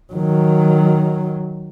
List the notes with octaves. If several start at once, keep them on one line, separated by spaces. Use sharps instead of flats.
D#3 F#3